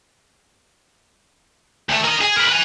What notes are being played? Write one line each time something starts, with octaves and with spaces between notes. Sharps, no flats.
D2 A3
A#4 D#5
G#4
A#4 B4
B4 G#5